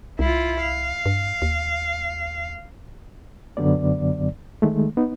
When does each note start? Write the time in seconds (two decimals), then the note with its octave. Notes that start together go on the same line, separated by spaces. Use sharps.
0.19 C2 E4 F4
0.61 F5
1.06 G2
1.42 D#2
3.57 F#2 D3 F#3 B3 D5
4.62 D#3 G#3 A3
4.97 B3 D#4